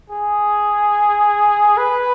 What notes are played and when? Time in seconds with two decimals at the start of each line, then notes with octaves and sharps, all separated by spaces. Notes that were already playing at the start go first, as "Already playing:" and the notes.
0.10 G#4
1.77 B4